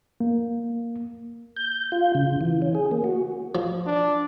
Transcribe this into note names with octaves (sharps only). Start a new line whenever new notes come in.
A#3
G6
F4
C#3
E3
C#4
G#4
A#3
F#4
F3
D4